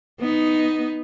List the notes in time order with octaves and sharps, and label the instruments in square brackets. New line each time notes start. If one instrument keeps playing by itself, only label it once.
[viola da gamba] B3 D#4